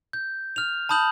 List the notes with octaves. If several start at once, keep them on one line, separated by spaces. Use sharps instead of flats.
G6
F6 F7
A5 B5 D#6 G6 F#7